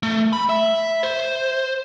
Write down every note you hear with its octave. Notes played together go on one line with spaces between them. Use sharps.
A3
B5
E5
C5